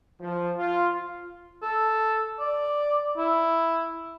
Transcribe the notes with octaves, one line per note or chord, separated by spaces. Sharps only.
F3
F4
A4
D5
E4